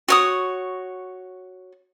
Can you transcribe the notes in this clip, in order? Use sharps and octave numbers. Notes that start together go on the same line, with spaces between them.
F#4 C#5 D#6